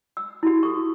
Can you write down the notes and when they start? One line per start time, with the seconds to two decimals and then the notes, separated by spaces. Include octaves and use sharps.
0.17 E6
0.43 E4 F#4 G4
0.63 A4 C#6